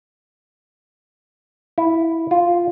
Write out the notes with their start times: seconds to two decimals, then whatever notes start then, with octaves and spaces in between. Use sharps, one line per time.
1.78 E4
2.31 F4